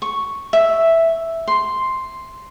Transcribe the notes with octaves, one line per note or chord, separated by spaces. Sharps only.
C#6
E5
C6